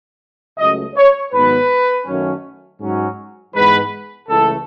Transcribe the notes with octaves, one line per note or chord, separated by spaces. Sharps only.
C#2 C#3 F#3 A3 C#4 D#5
C#5
G#2 D#3 F#3 B3 B4
F#2 D#3 F#3 A3 C#4
G#2 F#3 C#4
G#2 E3 G#3 B3 B4
C#2 C#3 E3 A3 A4